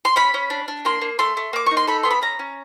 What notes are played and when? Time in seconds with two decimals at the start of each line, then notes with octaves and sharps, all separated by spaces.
0.05 C6
0.16 C#4 B5
0.34 C#4
0.50 D4
0.68 D4
0.85 A#3 C6
1.01 A#3
1.19 A3 C6
1.37 A3
1.53 A#3 D6
1.66 D#4 C#6
1.77 C6
1.87 A4 B5
2.03 B3 C6
2.11 B5
2.22 C#4 A#5
2.39 C#4